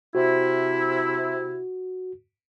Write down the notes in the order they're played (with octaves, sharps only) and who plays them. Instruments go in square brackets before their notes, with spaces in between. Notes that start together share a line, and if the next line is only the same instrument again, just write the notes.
[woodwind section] C3 E4 [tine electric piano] F#4